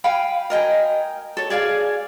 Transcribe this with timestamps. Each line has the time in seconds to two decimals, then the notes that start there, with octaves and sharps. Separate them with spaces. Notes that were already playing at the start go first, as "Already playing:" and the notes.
0.04 F5 G5 G#5 B5
0.50 A#4 D#5 G5 G#5
1.37 A4 C#5
1.50 G#4 D5 F5 G#5